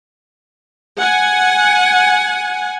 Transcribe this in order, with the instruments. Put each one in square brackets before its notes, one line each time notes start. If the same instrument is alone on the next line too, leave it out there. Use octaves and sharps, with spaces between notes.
[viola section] F#5 G#5